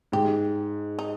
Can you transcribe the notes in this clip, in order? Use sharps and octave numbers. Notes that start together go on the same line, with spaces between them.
G#2 G4
D#4